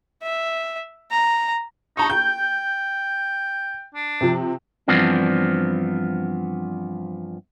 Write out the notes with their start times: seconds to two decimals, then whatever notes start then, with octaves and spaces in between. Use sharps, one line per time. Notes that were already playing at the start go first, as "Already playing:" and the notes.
0.23 E5
1.11 A#5
1.97 D#4 A5 A#5 C#6
2.10 G5 G6
3.95 D4
4.21 C3 F3
4.88 G2 E3 F3 B3 C4 D4